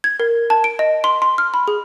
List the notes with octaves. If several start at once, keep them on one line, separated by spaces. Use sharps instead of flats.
G#6
A#4
A5
D7
D#5
C6
C6
F6
B5
G#4